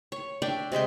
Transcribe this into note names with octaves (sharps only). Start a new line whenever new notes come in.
C#5
D4 D5 E5 G5
C3 G#3 E5 G5